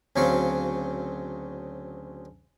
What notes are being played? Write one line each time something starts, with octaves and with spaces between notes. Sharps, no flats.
D2 C#3 F#3 C4 F5 C#6